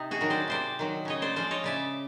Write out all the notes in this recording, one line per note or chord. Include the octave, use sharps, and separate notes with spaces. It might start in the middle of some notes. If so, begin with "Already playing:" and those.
Already playing: C3 D#4
F#4 G#4
D#3 F#3
C5 D5
C3 C5 D5
D#3 F#3
C#3 C#5 D#5
C5 D5
F3 G#3 C5 D5
C#5 D#5
C#3 D5 E5